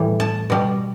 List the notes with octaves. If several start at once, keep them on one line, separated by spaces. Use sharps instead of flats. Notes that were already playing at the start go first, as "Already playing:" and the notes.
Already playing: A2 E3 G3
A5
B2 G3